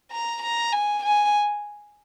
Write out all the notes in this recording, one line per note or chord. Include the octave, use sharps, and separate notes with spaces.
A#5
A#5
G#5
G#5